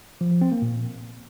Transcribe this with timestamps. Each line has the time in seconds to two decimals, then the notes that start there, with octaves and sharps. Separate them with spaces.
0.21 F3
0.31 F3
0.41 C4
0.52 A#3
0.62 A#2